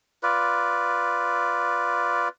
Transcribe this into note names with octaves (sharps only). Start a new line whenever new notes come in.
F4 B4 D5